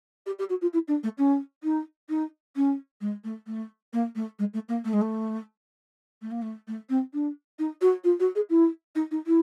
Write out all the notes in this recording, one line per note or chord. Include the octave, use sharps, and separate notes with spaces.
G4
G4
F#4
F4
E4
D4
A3
C#4
D#4
D#4
C#4
G#3
A3
A3
A#3
A3
G#3
A3
A#3
A3
G#3
A3
A3
A#3
A3
A3
C4
D4
D#4
F#4
F4
F#4
G#4
E4
D#4
D#4
E4